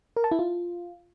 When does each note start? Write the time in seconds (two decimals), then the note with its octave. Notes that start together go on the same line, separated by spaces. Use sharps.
0.16 A#4
0.24 A5
0.31 E4
0.39 F4